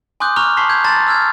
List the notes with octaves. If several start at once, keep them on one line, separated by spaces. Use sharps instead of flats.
G#5 C6 D6 D#6 F#6 G6
A#5 C#6 D6 F6 F#6 F7
A5 C6 C#6 B6 C7
G6 G#6
A5 A#5 C6 A6
E6 F6 G#6